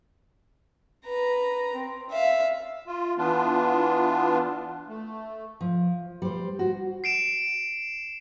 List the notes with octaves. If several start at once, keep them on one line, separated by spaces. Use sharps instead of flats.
B4 A#5
C4
E5 F5
F4
E3 B3 D4 F4
A3
F3
G3 C5
F#4
C7 D7 E7